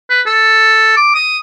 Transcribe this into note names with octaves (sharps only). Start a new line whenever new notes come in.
B4
A4
D6
D#6